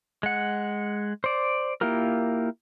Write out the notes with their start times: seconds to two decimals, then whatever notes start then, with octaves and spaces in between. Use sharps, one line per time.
0.23 G#3 F#5
1.24 C5 D5
1.81 A#3 E4 F4 G4 A#4